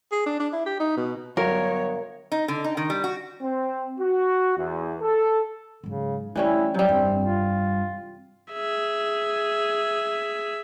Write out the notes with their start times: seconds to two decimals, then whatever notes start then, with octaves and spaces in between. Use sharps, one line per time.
0.12 G#4
0.26 D4
0.40 D4
0.52 E4
0.66 G4
0.80 D#4
0.97 B2
1.37 G1 F#3 B3 A#4 C#5
2.32 D#4
2.48 D3
2.64 D#4
2.77 D#3
2.90 G3
3.04 F#4
3.42 C4
4.00 F#4
4.57 E2
5.02 A4
5.84 G#2 C#3 F#3
6.36 E3 G3 A3 C#4 E4
6.74 C3 F#3 G3
6.88 F1 G2 C4
7.18 F4
8.53 G#4 E5